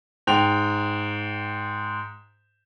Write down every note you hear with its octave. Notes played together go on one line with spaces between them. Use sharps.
G#2 G5 F7